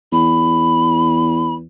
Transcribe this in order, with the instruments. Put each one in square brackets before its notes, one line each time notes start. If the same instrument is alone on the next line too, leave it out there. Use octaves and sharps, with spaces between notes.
[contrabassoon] E2 [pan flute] B5